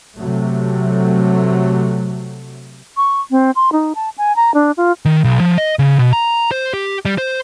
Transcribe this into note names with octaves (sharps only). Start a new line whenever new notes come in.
C3 F#3 A3
C#6
C4
C6
D#4
A5
G#5
A#5
D4
F4
D#3
B1
F3
D#5
C#3
B2
A#5
C5
G4
G3
C5